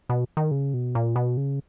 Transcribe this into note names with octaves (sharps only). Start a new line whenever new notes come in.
B2
D#3
C#3
B2
A#2
B2
C#3